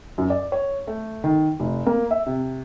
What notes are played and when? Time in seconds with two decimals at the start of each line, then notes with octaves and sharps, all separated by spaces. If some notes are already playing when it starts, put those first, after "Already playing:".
0.18 F#2
0.30 D5
0.52 C#5
0.87 A3
1.24 D#3
1.60 F1
1.86 A#3
2.11 E5
2.27 C3